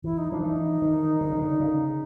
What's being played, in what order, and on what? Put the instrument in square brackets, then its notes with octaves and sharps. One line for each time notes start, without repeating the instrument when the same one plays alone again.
[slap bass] E3 [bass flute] E4
[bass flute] D#4
[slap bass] F3 [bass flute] D4
[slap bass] E3 [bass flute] D#4
[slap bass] D#3
D3
C#3
D3
C#3